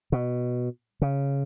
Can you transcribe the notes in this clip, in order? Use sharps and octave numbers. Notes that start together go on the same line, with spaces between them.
B2
C#3